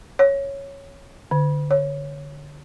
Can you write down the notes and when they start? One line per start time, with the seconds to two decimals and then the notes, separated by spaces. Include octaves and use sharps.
0.19 C#5
1.31 D3
1.71 C#5